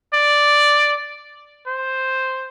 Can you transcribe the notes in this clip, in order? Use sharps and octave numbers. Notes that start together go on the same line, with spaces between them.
D5
C5